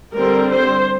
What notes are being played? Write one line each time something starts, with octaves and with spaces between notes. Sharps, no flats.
D3 G3 C4 A#4
C5